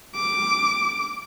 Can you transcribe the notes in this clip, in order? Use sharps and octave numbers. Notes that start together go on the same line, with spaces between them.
D6